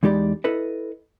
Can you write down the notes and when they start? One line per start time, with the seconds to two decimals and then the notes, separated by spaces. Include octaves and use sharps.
0.03 E2 G#3 D#4 G4 D5 B5
0.44 E4 A4 B4 D#5